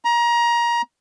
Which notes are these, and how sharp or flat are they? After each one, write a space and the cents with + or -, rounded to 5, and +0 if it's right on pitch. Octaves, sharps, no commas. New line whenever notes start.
A#5 +25